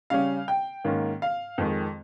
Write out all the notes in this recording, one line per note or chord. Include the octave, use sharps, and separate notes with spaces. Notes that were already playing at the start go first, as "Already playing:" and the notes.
C#3 G3 C#4 F5
G5
G#2 D#3 A#3 C#4
F5
F2 D#3 G#3